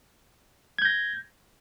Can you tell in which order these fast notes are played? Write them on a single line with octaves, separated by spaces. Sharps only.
G#6 G6 A#6